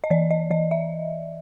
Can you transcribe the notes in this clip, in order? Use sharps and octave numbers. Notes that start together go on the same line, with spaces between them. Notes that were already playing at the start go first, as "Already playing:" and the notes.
D#5
E3 D5
D#5
E3 D#5
E5